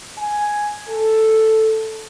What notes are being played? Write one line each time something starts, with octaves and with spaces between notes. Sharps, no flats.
G#5
A4